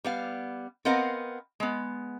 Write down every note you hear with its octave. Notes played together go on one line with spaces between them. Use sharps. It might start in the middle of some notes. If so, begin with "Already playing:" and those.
G3 B3 F5
B3 C4 A#4 D#5 F5 F#5
G#3 B3